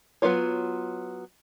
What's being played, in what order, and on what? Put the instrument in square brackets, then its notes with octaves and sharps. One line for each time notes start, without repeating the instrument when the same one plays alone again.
[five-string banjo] F#3 B3 D#4 F4 C#5